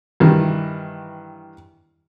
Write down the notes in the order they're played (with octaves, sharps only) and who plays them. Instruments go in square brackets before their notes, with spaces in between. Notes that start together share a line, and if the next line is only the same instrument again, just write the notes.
[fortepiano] G2 D#3 E3